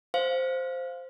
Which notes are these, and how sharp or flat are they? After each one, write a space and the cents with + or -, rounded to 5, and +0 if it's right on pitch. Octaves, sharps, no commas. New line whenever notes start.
C5 +0 F5 +0